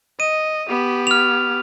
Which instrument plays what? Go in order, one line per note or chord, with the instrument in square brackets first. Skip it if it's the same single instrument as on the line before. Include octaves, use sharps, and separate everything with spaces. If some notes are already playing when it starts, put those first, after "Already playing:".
[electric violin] D#5 [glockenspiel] D#7
[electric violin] B3 G4
[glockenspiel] F6 F7